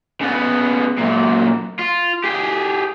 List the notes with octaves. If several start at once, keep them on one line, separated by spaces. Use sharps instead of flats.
C#3 B3
F#2 A#2
F4
G4 G#4